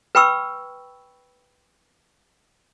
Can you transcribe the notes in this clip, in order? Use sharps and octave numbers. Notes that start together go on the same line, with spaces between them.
B4 G5 B5 C#6 E6